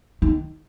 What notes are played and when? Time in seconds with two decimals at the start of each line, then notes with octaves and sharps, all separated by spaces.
0.22 D#3